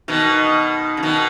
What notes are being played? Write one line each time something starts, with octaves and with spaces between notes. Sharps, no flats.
B2 D#3
C#3
B2 D#3